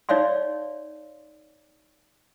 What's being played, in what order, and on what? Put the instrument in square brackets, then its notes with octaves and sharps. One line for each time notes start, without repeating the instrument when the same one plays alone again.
[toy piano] D#4 C#5 D5 E5 F5 C6